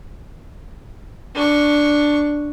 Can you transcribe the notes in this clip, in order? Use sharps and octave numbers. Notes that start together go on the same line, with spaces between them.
D4 C#6